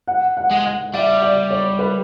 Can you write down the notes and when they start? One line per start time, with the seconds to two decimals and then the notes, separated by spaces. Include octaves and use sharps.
0.08 F#5
0.37 F#5
0.51 G#3
0.65 F#5
0.94 G3 E5
1.23 D5
1.51 C#5
1.79 B4